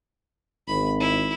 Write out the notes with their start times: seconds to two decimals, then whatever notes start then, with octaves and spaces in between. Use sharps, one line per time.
0.68 G#1 B5
1.00 E4